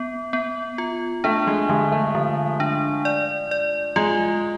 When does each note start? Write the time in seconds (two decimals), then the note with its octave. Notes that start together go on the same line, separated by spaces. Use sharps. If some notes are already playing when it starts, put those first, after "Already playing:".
Already playing: B3
0.33 B3
0.78 F4
1.24 A3 D4
1.47 G#3
1.69 D3 G#3
1.92 A3
2.15 D3 F3
2.60 D4
3.05 D5
3.51 D5
3.96 G#3 F4